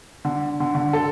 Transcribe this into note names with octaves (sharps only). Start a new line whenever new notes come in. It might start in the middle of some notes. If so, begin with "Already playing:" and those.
D3
D3
D3
A4